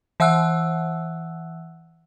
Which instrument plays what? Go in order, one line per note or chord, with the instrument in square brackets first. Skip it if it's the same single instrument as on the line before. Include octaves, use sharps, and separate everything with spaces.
[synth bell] E3 E5 F#5 E6 F#6